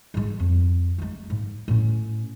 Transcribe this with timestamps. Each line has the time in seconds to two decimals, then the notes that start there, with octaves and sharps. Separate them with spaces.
0.14 G#2 G#3
0.39 F2
0.98 G#3 A3
1.30 G#2
1.68 A2 C#4